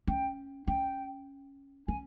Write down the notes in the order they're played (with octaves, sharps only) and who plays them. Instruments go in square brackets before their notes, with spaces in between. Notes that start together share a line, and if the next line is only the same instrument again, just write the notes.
[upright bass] C#4 [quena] G5
[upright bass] C#4 [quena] G5
[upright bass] C#4 [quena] G#5